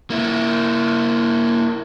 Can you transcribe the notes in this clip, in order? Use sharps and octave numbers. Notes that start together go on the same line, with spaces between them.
A#3 E4